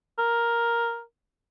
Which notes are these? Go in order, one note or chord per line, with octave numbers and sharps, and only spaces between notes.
A#4